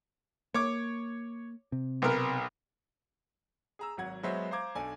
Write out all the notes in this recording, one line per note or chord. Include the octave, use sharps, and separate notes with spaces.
A#3 C#5 D6
C3
B1 B3 A#4
G#4 A#5 E6
G#1 F#3 F#5 G#6
F#3 G#3 B3 C5 E5
C5 F5 A#5 D6 G#6
B1 D4 A4 D5 G#5